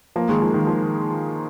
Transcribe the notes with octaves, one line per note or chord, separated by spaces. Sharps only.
F3 A#3
D#3 G#3
F3
D#3
F3